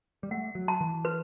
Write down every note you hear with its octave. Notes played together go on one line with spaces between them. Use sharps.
G3
A3 F#5
F#3
A5
E3
B4